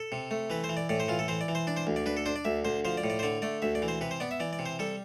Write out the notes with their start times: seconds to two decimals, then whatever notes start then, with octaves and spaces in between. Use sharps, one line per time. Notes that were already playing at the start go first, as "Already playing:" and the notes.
Already playing: A4
0.12 C3
0.31 A3
0.50 E3 B4
0.64 C5
0.69 E3
0.77 D5
0.89 A2 D5
1.00 C5
1.08 E3 F4
1.19 A4
1.28 E3 C5
1.41 D5
1.48 E3
1.55 C5
1.67 D4 D5
1.77 C5
1.87 D2
1.96 D5
2.06 D4 B4
2.17 A4
2.26 D4 C5
2.36 D5
2.45 D2 E5
2.65 D2 C5
2.85 F3 C5
2.97 D5
3.04 A2
3.10 D5
3.19 C5
3.23 D3 D5
3.42 A3 D5
3.62 D2 E5
3.75 D5
3.82 E3
3.88 C5
4.01 C3 B4
4.11 C5
4.20 B3 D5
4.31 E5
4.40 E3 D5
4.53 D5
4.59 C3
4.66 C5
4.79 G3 A4